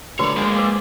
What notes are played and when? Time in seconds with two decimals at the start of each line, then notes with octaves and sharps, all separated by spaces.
0.19 D3 A3 F4 F#4 B4 C#5 D5
0.37 G#3 A#3 G#4 C5 D5
0.57 B4 D6